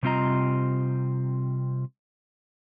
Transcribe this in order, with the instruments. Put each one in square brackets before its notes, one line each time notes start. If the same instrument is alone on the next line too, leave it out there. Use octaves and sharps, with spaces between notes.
[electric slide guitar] C3 G3 C4 F4 D#5 A#5